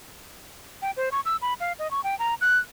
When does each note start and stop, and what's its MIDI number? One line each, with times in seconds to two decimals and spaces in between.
0.82 0.91 79
0.97 1.09 72
1.12 1.20 85
1.25 1.37 88
1.42 1.54 83
1.60 1.73 77
1.79 1.90 75
1.91 2.03 85
2.04 2.17 79
2.19 2.35 82
2.41 2.59 90